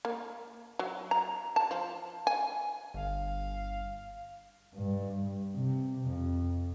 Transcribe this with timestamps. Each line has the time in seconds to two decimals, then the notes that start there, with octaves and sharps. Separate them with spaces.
0.05 A#3
0.79 F#3
1.11 A#5
1.56 A5
1.71 F3
2.27 G#5
2.94 G1 F5
4.75 G2
5.56 C3
6.08 F2